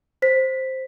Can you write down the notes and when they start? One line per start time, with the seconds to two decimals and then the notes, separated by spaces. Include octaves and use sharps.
0.22 C5 B6